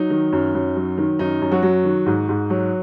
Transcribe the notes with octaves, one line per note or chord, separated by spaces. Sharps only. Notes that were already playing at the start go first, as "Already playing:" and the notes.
Already playing: F#3 D#4
D#3
F#2
F#2
F#3
D#3
F#2 D#4
F#2
F#3 F#4
F#3
D#3
G#2
G#2
F#3